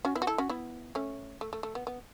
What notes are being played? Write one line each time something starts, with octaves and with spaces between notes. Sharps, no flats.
C#4 F#4
B3 E4
F#4
E4 A4
C#4 F#4
B3 E4
A3 C#4
A3
A3
A3
B3
B3